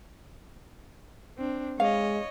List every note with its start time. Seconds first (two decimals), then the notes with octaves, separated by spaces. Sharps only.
1.38 C4 D4
1.80 G#3 C#5 D#5 F5